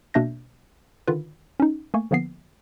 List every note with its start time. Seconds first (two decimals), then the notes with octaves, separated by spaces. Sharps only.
0.14 B2 A#3 D4 E5 G6 A#6
1.08 D3 D#3 F4 B4
1.60 C#4 D#4
1.94 A3 A#3 G#5 C#6
2.11 D3 F3 A#3 B3 C7